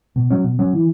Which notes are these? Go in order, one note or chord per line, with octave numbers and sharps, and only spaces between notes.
B2
F#3 C#4
B2
F#3 C#4
E3